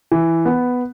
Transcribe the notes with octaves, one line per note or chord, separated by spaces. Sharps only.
E3
B3